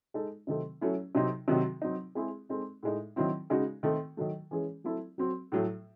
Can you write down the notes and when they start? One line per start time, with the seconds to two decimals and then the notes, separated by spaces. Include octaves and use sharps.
0.14 G#3 D#4 A4
0.47 C3 D#3 F#3 A3 C4
0.81 F#3 A3 C#4 E4
1.15 C3 F#3 C4 D#4
1.48 C3 D#3 F#3 C4 F#4
1.82 F#3 C4 D#4
2.15 G#3 C4 E4 G#4
2.49 G#3 C4 D#4 A4
2.83 A2 G#3 D#4
3.16 D#3 F#3 C4 E4
3.50 C#3 G#3 D#4 F#4
3.83 D#3 A3 C4
4.17 D#3 F#3 A3
4.51 E3 G#3 C#4 G#4
4.84 F#3 A3 C4 E4 A4
5.18 F#3 C4 F#4
5.52 A2 F#3 A3